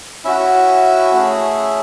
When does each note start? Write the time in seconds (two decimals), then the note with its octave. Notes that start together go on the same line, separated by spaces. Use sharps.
0.24 C#4 E4 F#4 E5
1.12 A3 C#4 G#4